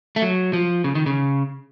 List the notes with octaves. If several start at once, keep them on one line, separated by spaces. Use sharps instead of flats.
A3
F#3
F3
C#3
D#3
C#3